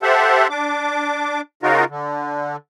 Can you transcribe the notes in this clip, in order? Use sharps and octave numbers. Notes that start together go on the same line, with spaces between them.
G4 A4 C5 E5 F#5
D4 D6
C#3 D#4 F4 F#4 A#4
D3